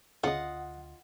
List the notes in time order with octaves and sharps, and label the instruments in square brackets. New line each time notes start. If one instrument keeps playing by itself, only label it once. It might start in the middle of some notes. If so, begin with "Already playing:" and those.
[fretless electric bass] D2 [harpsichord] C#3 [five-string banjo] F4 D#5 [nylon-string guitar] F#5